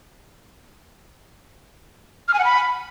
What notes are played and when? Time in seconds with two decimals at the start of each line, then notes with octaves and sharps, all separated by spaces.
2.28 F6
2.34 G#5
2.39 F#5
2.44 B5